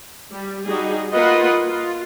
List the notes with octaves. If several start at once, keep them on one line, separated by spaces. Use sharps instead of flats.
G3
G3 D#4 F#4 G#4
A#3 F4 B4 D#5 F#5
F4